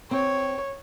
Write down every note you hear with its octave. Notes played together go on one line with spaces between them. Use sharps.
C4 C#5